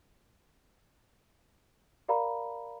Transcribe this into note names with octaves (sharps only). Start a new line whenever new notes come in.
G4 A#4 D5 F5 A#5 B5